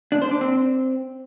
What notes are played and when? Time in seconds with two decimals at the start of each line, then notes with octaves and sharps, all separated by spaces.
0.12 D4
0.22 C5
0.31 D4
0.41 C4